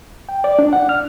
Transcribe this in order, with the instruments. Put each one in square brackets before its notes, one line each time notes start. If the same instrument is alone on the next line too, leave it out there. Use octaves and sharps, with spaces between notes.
[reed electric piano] G5
D5
D4
F#5
F6